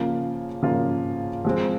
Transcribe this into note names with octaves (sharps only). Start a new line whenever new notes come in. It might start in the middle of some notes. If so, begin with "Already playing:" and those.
Already playing: C#3 F3 A#3 F4
C#3 F3 A#3 F4
F3 G#3 C4